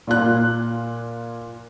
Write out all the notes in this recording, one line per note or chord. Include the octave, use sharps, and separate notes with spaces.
A#2 F4 F#6